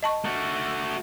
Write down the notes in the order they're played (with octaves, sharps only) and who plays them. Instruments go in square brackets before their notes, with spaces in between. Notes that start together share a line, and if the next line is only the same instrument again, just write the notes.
[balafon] D#5 A5 C#6
[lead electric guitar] A3 F#4